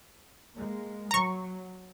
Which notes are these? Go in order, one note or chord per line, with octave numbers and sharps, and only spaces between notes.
G#3 A#3
F#3 A#5 C#6